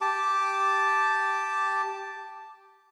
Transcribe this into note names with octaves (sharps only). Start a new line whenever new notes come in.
G4 A5 D6